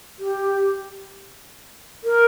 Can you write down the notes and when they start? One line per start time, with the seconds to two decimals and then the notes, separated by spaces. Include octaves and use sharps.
0.19 G4
2.04 A#4